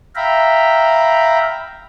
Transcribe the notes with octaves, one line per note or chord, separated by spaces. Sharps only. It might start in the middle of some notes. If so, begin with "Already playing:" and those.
E5 F5 G5 A#5 B5